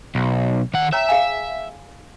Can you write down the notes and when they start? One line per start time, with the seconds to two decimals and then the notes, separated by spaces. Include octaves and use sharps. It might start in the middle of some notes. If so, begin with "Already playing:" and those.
0.15 B1
0.74 D#3 F#5
0.93 C#5 E5 G5 A#5
1.08 G#4 F5 G#5